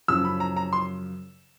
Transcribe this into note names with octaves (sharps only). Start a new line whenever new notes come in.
F#2 C#3 F3 E6
B5
A#5
A#5
C6